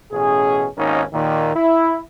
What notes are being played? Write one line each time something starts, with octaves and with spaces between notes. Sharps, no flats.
A1 B2 C#4 G#4
G#1 D#2 A#3 C#4 D#4
D#2 A#2 D#3
E4